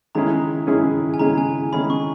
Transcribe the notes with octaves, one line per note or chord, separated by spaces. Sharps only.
D#3 G#3 C#4 E4 G#4 A#5
D#3 G#3 C#4 E4 G#4
G#5
D#3 G#3 C#4 E4 G#4 A#5
G#5
D#3 G#3 C#4 E4 G#4 B5
C#6